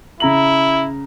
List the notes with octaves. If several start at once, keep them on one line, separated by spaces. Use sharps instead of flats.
C#3 E4 A#5 F#7